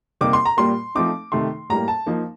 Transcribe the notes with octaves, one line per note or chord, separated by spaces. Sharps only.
C3 G3 A#3 D#4 D6
C6
A#5
A#2 G3 A#3 C6
F3 A3 C4 D#4 D6
C3 D#3 A3 C6
A2 G3 A#3 A#5
A5
F3 A#3 D#4